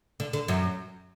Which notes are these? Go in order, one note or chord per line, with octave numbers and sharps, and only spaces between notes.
D3
D3
F#2 F#3